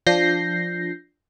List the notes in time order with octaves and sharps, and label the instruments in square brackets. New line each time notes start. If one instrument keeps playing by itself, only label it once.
[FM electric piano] F3 D4 G6 A#6 C7